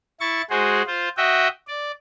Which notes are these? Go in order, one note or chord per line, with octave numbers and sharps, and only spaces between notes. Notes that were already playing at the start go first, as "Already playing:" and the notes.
E4 C#6 A6
G#3 F#4 G#4 C5
F4 C5
F#4 D#5 E5 G5
D5